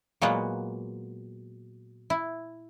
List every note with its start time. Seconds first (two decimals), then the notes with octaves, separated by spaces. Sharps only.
0.21 A#2 F#3 G#3 A#3 B3
2.10 E4